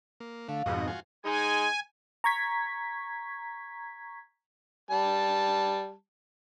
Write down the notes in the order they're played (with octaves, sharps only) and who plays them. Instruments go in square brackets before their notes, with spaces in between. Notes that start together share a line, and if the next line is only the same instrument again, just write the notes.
[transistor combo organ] A#3
[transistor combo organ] D3 A3 [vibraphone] F5
[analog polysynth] F2 G#2 B2 [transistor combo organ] F#4 D#5
[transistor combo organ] F4 F#4 G#5
[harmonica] G#3 D#4 [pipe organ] G#5
[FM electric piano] A#5 C#6 G#6 B6
[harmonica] G3 A5